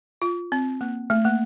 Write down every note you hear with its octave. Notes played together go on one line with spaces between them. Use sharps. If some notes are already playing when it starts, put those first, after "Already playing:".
F4
C4
A#3
A3
A#3